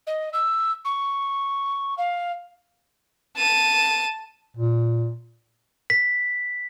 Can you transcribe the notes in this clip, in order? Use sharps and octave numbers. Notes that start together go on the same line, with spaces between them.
D#5
E6
C#6
F5
A5 D#7
A#2
B6